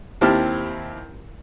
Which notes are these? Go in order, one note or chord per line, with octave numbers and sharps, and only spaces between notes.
D#2 C4 E4 G4 A5 F6